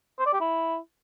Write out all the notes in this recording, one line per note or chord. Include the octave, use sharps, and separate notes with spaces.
C5
D5
G4
E4